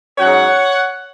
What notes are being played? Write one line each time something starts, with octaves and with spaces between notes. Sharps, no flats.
G#2 F#3 C#4 C#5 F#5